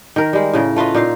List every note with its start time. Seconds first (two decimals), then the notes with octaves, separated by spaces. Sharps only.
0.16 D#3 A#4
0.33 G3 G#3
0.53 A2 C#3 A#4
0.76 A3 F4 B4 D#5
0.95 A#2 D#4 F5